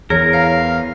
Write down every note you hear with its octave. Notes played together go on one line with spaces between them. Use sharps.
E2 G#4 A#4 C#5
C#5 F5